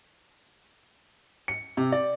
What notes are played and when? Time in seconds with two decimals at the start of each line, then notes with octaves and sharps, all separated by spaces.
1.48 C#7
1.77 C3
1.92 D5